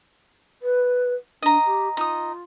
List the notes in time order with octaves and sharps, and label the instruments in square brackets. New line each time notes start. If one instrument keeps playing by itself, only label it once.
[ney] B4
[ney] D4 [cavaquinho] D#5 A#5
[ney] G4
[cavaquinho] D#4 D#6 [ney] F4